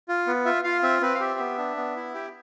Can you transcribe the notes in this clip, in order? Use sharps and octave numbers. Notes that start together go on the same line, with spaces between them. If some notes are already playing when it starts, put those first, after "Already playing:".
F4
B3
F4 E5
F4 F5
C4 E5
C4 B4
F5
G4 E5
B3
D4
B3
E4
G4